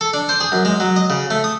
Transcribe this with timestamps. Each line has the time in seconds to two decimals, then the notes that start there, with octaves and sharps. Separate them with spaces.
0.01 A4
0.13 D4
0.29 C5
0.41 G#4
0.52 F#2
0.65 G#3
0.80 F#3
0.96 D#5
1.10 C#3
1.31 A3
1.44 D#6